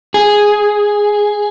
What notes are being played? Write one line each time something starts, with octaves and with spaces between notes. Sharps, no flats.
G#4